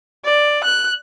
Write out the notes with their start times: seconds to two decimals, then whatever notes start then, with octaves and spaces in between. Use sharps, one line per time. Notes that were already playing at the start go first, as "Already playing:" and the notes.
0.25 D5
0.64 F#6